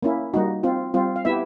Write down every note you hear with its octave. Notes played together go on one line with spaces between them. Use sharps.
A#3 C#4 E4
G3 A#3 D#4 F#4
C4 F4
G3 C4 F4
F5
B3 E4 G4 E5